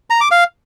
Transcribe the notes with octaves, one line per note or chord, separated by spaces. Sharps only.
A#5
D6
F5